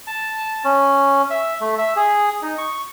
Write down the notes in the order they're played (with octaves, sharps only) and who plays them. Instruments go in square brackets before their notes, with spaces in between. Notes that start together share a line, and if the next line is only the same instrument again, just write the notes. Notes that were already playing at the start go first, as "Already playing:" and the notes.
[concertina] A5
C#4
E5
A3
E5
G#4
D#4
C#6